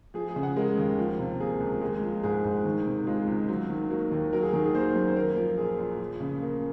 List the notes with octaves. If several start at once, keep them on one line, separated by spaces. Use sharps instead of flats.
F3 G#4
G#4
C#3
F#5
G#3 A#4
D#2
F3
C3
A#3 G#4
C#2
G#3
F3
G#2 G#4
G#2
D#3
C3
G#3 F4
C#2
F#3
D#3
A#3 F#4
D#2
F#3 A#4
G#4
D#3 G#4
G#4
A#3 C5
F#2
C5
A#3 A#4
F3
A#2 G#4
A#2
F3
C#3
A#3